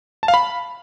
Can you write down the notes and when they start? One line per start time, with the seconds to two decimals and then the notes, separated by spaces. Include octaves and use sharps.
0.23 A5
0.28 F5
0.34 B5